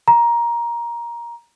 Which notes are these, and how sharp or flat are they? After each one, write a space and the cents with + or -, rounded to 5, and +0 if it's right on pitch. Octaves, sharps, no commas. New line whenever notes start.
A#5 +15